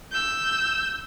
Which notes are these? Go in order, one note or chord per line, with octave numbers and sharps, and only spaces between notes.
E6 G6